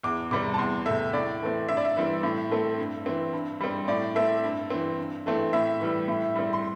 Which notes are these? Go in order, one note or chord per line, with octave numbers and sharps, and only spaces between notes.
E2 D6
C3 G3 C4 D6
A5
E2 C6
C3 A3 E5
A2 D5
E3 A3 C4
G2 E5
D5
E5
E3 G3 C4
A2
A3 C4
G2
E3 C4
G2
G3 C4
A2 D5
A3 C4 E5
G2
E3 C4
G2
E3 A3 C4
A2 E5
E3 G3
A2
G3 C4
C6